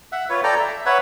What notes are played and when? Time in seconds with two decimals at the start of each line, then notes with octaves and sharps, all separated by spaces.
0.12 E5 F#5
0.30 F4 B4 C#5
0.43 A4 D5 G5 A#5
0.60 E5
0.86 B4 C#5 E5 F#5